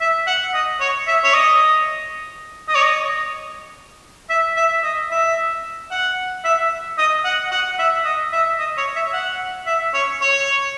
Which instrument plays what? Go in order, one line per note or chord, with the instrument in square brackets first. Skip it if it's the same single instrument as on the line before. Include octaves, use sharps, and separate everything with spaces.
[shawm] E5
F#5
D#5
C#5
E5
C#5
D#5
D#5
C#5
D#5
E5
E5
D#5
E5
F#5
E5
D#5
F#5
F#5
E5
D#5
E5
D#5
C#5
E5
F#5
E5
C#5
C#5